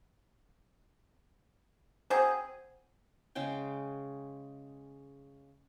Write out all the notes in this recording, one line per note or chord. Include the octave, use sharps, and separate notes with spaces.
F#3 C4 G#4 C5
C#3 G#3 G5